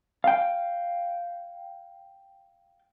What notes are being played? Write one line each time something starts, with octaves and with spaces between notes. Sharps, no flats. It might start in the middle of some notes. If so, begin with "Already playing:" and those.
F5 G5